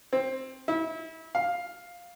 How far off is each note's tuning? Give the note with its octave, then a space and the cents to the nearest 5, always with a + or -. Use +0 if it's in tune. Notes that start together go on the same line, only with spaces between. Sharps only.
C4 +10
E4 -30
F5 +5